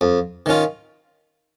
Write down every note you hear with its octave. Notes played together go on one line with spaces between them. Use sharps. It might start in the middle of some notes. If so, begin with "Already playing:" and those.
F2
D#3 C#4 F4